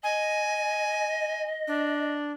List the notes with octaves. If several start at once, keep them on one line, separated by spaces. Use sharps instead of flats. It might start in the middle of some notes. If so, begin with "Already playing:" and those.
D#5 G#5
D4